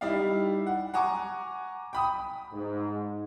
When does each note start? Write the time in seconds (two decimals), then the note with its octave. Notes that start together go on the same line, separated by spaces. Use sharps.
0.01 G3 D#4 E4 D5 F5
0.67 F#5
0.94 F#5 G#5 A#5 C#6 D6
1.93 G5 B5 D#6
2.52 G#2